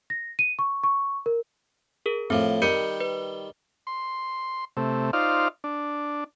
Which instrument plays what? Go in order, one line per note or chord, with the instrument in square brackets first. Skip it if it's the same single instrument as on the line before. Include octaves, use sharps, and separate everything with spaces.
[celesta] A#6
D#7
C#6
C#6
A#4
[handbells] G#4 A#4
[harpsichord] A2 F3 [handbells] C4
[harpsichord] D#3 G3 [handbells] A#4 G6 C#7
[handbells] B4
[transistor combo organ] C6
C3 A3
D#4 F4 C5 D5 F5
D4